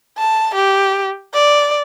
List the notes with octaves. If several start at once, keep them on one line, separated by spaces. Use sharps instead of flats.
A5
G4
D5